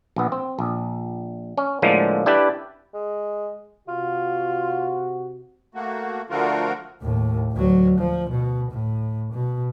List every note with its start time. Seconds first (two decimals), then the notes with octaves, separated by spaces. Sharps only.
0.16 A#1 B3
0.32 C4
0.59 A#1
1.57 C#4
1.82 A2 D3 F3 G#3 A#3
2.26 D4 E4 G4 B4 D5
2.94 G#3
3.88 C3 F4 F#4
5.75 A3 A#3 F#4
6.30 D3 F3 A3 F4 F#4 A#4
7.02 D#2 A2
7.52 D2 F#3
7.98 F3
8.29 B2
8.72 A2
9.32 B2